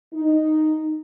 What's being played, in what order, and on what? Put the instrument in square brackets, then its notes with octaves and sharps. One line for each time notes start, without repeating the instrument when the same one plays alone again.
[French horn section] D#4